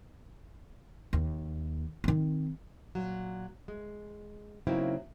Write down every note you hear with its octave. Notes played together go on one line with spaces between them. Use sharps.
D#2
D#3 C4
A#2 F#3
G#3
C#3 F#3 A#3 C4 D#4 E4